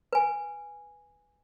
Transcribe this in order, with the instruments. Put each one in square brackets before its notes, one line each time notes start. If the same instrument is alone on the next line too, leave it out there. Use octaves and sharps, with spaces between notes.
[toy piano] B4 G#5